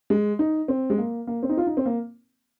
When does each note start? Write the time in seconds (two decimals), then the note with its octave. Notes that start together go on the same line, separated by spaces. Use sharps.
0.10 G#3
0.39 D#4
0.68 C4
0.90 G#3
0.98 A#3
1.27 A#3
1.43 C4
1.49 D#4
1.57 F4
1.67 D#4
1.77 C4
1.86 A#3